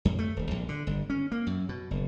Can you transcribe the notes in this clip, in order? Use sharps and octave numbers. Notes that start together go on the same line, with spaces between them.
F2
A3
D#1
A#1
D3
G1
C#4
A#3
F#2
B2
F#1